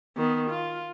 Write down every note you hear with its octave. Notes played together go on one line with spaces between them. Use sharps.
D#3 B3
F4